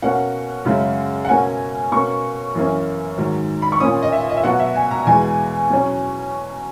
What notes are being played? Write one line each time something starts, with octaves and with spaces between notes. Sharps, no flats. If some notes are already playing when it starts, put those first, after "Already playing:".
B2 A#3 C#4 F#5
F#2 C#3 G#3
F#5
B2 A#3 C#4 G#5
B2 A#3 C#4 C#6
F#2 E3 A#3 C#4
G#2 D#3 F#3
B5
C#6
A#2 A#3 C#4 D#6
D#5
E5
D#5
E5
B2 F#3 B3 F#5
E5
G#5
A#5
E2 B2 G#3 G#5
B2 F#3 C#4